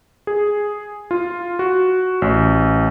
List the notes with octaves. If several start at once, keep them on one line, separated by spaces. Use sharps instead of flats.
G#4
F4
F#4
A1